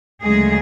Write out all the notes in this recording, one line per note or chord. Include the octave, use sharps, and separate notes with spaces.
D2 C#3 F#3 G#3 A3 G#4